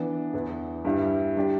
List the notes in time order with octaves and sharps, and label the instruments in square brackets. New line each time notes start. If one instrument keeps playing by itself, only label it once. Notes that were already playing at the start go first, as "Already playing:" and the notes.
Already playing: [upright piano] E3 B3 D4
E2 E3 B3
G2 G3 E4
G3 D4 G4